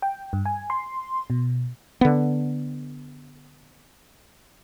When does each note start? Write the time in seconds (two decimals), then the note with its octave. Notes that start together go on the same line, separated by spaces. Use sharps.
0.02 G5
0.33 G2
0.46 G#5
0.70 C6
1.30 B2
2.01 D3 B3